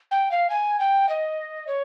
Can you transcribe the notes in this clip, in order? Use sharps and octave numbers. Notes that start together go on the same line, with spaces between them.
G5
F5
G#5
G5
D#5
C#5